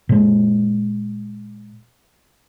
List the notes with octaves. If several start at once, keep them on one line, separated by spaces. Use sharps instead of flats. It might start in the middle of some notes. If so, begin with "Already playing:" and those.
A#2 G#3